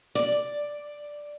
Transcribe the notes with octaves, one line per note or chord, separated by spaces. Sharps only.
D5